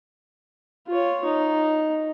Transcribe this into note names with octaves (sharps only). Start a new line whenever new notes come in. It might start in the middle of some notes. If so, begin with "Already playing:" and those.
F4 C#5
D#4